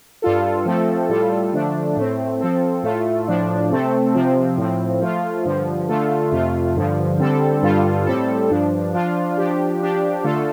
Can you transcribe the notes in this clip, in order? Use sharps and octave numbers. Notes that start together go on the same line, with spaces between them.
G2 G3 F4 A4
F3 A3 C4 A4
A2 G3 F4 A4
D3 F3 A3 D4
A2 A3 C4
F3 C4 A4
A2 A3 F4 A4
A2 F3 D4
C3 A3 C4 A4
C3 F3 C4
A2 F3 C4
F3 A3 F4
G2 D3 F3
D3 A3 F4 A4
F2 C3 A3 F4
G2 D3 F3
D3 G3 C4 A4
G2 D3 G3 F4 A4
A2 G3 C4 A4
G2 F3 D4
F3 D4 F4
F3 D4 G4
F3 D4 G4
D3 A3 F4 A4